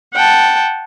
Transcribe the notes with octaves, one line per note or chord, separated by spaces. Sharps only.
F#5 G5 A5